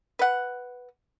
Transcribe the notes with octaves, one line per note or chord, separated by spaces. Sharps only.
B4 F#5